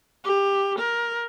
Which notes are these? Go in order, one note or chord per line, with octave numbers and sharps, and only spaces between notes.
G4
A#4